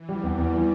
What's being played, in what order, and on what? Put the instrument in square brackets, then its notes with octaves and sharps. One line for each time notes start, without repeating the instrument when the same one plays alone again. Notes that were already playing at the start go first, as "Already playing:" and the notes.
Already playing: [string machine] E3
[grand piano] G3
[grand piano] E2 [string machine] G3
[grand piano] E2
E3